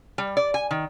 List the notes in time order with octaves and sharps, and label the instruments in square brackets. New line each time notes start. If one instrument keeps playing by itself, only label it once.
[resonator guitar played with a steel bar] G3
D5
G#5
D#3